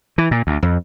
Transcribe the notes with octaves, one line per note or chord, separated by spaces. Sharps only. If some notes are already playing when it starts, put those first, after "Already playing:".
E3
A#2
D2
F2